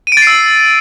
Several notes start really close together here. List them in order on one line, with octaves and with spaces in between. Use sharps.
D#7 D7 A6 C7 E6